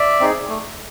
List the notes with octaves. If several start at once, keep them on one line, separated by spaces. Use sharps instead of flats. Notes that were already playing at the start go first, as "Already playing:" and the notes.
Already playing: D5 E5
C4 D#4 G#4
A3